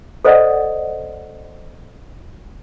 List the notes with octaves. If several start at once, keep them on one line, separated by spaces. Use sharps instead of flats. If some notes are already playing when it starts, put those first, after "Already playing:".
A4 C5 D5 D#5 F#5